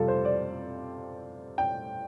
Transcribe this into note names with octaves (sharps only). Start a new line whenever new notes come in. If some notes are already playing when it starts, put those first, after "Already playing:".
Already playing: F2 C3 G3 F4 A4
C5
D5
G5